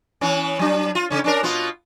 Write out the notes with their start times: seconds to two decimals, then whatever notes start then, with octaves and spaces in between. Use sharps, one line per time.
0.21 E3 B3 C#4
0.59 F#3 D4
0.95 F4
1.10 C#3 C#4
1.24 C#4 D4 A#4
1.43 B2 B3 F4